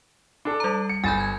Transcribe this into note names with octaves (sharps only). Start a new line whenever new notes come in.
D4 A4
G3 A#5
C#7
G1 G#5 B5 G6 A6
G#6